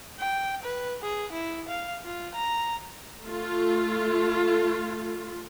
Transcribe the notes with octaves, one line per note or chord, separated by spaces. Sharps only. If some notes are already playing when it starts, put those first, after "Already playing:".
G5
B4
G#4
E4
F5
F4
A#5
A3 F4